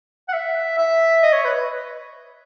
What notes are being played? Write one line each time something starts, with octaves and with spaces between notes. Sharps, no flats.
F#5
E5
E5
D#5
C#5
B4